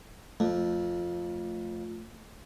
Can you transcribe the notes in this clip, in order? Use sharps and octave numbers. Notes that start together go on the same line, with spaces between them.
F2 A3